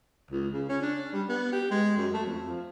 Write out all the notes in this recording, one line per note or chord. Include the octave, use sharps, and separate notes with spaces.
C#2
C#3
C#4
D4
G3
B3
G4
G#3
F#2
A3
F2
F3